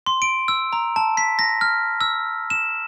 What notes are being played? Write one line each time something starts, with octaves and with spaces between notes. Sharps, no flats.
C6
D7
E6
A#5
A5
B6
A#6
F6
E6
E7